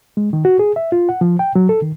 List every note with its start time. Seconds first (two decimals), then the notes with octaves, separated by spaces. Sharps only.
0.17 G#3
0.33 D#3
0.45 F#4
0.59 G#4
0.76 E5
0.92 F4
1.09 F#5
1.21 F3
1.39 G5
1.56 F#3
1.69 A4
1.82 D#3